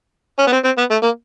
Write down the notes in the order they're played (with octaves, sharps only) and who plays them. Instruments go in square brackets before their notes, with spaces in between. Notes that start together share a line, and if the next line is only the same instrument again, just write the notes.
[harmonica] C#4
B3
C4
C4
B3
A3
A#3